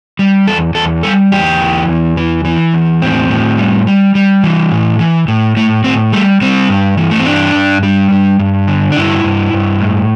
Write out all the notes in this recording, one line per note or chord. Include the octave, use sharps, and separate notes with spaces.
G3
E2 A4
E2 A4
G3 A4
E2 G4
E3
E2
E3
E3
E2
A2 C4
A2
G3
G3
G3
E3
A2
E3
A2
A2 A3
A2 C4
G3 A3
G3 C4
G2
E3
A3
C4
G2 D4
G2
G3
G2
G2
D3
D4
G2 E4
G2
G2
A2